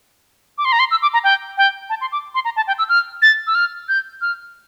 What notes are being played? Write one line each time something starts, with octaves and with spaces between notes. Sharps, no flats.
D6
C6
A#5
C6
E6
D6
A#5
G5
G5
A5
C6
D6
C6
A#5
A5
G5
E6
F6
A6
E6
F6
G6
F6